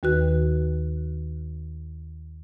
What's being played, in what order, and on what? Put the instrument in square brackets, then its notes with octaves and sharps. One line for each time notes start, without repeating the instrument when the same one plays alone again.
[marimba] D#2 D#3 F#4 B4 F#6